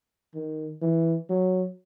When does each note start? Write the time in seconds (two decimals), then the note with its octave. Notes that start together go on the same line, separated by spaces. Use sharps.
0.35 D#3
0.82 E3
1.30 F#3